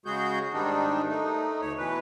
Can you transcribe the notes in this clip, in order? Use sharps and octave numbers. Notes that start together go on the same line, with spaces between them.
C#3 G#3 F#4 G#4 G6
G#2 D#3 G3 D4 D#4
A3 D#4
D2 C#5
B2 E3 B4